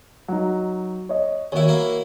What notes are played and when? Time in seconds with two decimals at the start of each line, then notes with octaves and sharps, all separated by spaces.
0.28 F#3 D#4
1.09 C#5 D#5
1.52 D#2 E4 F#4 C#5
1.68 A#3 E4